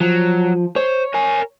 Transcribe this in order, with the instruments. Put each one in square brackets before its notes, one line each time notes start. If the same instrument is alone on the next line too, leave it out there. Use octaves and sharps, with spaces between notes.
[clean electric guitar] F3 [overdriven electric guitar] F#3
[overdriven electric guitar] C5 [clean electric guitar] C#5
[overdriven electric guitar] A#4 G#5